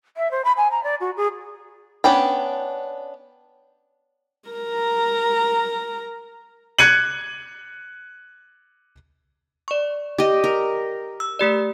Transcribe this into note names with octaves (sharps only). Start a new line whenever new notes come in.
E5
C5
B5
G#5
A#5
D5
F#4
G#4
B3 C#4 D4 G5 B5
A#4 A#5
F#6 G#6 C#7 D#7 F#7
D5 C#6
G4 D#5
A#4
E6
A3 G4 D5